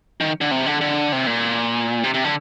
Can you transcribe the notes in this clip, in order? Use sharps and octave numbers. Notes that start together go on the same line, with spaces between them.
D#3
D3
C3
D3
D3
C3
A#2
C3
C3
D3